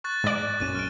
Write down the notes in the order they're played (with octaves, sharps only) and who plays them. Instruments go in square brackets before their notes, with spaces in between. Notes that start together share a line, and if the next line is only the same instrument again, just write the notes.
[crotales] C#6 F#6 A6
[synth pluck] G#2 D5
[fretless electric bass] A#1 F#2 C#4 [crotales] A6 D#7 E7
[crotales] F6 D7